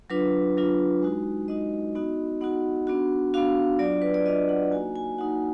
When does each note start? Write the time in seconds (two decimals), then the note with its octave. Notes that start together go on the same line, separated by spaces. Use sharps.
0.10 F#3 D4 F4 B4
0.57 F#3 D4 F4
1.03 G#3 D#4 F#4
1.48 G#3 D#4 F#4 D#5
1.95 B3 D#4 F#4
2.41 B3 D#4 F#4 F#5
2.87 B3 D4 F#4
3.34 B3 D4 F#4 F5
3.79 F#3 D4 F4 D5
4.02 B4
4.14 D5
4.26 F#3 D4 F4 D#5
4.49 F#5
4.71 A#3 D#4 F#4 G#5
4.96 G#5
5.18 A#3 D#4 F#4 F#5